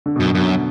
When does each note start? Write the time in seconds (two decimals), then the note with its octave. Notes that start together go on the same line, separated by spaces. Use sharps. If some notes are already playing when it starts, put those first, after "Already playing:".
0.06 D3
0.16 F#2 B2
0.26 D3
0.34 F#2 B2